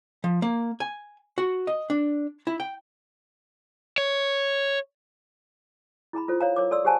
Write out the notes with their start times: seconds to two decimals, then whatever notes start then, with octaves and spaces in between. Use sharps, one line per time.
0.24 F3
0.42 A#3
0.80 G#5
1.38 F#4
1.67 D#5
1.90 D4
2.47 E4
2.60 G5
3.98 C#5
6.13 E4 G#4 A#5 B5
6.28 F4 A4 C5
6.41 C#5 F5 A#5
6.56 A#4 C#5 D6
6.71 A4 D5 C6 E6
6.85 G4 G#4 C5 F#5 G#5 A5